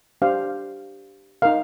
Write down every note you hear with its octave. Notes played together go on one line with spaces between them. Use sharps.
D4 G4 C5 F5
D#4 A#4 F5